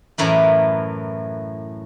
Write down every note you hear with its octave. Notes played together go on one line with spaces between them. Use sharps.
F#2 A2 E3 A#4 B4